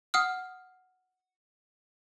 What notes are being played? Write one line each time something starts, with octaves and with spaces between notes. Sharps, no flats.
F#5 D#6 F6